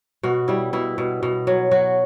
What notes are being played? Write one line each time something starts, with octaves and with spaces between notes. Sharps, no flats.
B2 F#4
G3 E4
B2 E4
B2
B2
F#3
F#3 F#4